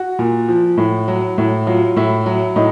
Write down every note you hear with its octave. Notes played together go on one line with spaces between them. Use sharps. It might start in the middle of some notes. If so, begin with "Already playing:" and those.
Already playing: F#4
A#2
F3
A2
F#3
A2
F#3 F4
A2 E4
F#3
A2 D#4